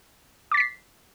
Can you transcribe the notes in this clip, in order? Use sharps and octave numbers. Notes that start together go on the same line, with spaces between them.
D6 A6 B6 C7